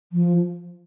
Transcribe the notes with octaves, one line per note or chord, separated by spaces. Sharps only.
F3